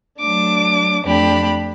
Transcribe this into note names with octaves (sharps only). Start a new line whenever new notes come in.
F#3 A3 D4 D6
F2 A3 D4 G4 B5